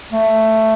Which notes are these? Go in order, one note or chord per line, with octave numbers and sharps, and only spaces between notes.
A3